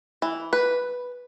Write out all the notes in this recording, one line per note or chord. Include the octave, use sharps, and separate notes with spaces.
E3
B4